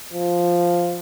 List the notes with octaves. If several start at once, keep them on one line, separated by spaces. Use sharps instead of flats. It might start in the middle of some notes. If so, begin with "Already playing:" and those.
F3